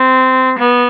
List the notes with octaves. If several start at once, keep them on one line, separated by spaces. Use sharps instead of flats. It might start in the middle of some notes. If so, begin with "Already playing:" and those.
Already playing: C4
B3